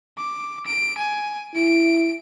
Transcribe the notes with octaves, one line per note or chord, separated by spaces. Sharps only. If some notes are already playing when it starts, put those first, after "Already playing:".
D6
D7
G#5
E4 D7